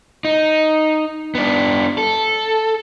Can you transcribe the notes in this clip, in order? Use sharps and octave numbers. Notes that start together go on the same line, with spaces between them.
D#4
B3 D4
A4